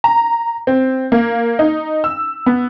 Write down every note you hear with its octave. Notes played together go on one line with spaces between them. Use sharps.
A#5
C4
A#3
D#4
E6
B3